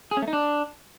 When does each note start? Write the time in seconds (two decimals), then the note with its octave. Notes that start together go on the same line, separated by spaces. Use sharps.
0.11 G#4
0.17 C#4
0.22 A3
0.28 D#4
0.33 D4